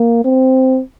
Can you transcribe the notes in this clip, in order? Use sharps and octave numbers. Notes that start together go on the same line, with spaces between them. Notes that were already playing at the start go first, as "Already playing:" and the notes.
Already playing: A#3
C4